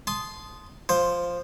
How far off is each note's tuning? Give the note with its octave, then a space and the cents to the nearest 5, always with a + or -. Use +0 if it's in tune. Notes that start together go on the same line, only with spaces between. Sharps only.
A5 -25 C6 -5 D#6 +0
F3 +0 C5 +0